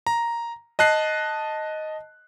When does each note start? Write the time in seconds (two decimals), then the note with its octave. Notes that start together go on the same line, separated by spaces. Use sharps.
0.07 A#5
0.79 D#5 A5 F#6 C7